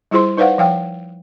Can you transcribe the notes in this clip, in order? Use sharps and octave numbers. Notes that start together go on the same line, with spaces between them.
G3 E4 F4 G#4 C5 C6
D#4 B4 C5 D5 F5 F#5
F3 F5 G5